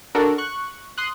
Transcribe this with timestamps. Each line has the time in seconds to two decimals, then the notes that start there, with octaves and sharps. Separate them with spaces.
0.15 D4 F#4 A4 A#4
0.38 C#6 F#6
0.98 C6 D#6 F#6